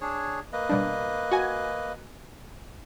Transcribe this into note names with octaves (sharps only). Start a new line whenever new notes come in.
D4 G#4 C#5
A#3 B4 D#5
B2 G3 D4
F#4 G#5